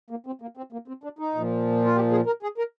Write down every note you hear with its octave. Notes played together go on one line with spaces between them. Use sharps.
A#3
C4
A#3
C4
A#3
C4
D4
D#4
A#2 F3
F4
G4
G#4
A#4
G#4
A#4